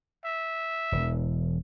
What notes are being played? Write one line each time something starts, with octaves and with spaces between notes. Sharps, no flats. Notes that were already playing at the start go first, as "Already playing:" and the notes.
E5
E1 E3